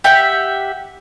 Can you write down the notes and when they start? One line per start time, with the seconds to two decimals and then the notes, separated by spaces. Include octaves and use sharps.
0.04 G4 E5 F#5